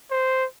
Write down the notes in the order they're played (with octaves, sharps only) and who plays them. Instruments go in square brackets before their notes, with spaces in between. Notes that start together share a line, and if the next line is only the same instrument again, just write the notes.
[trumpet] C5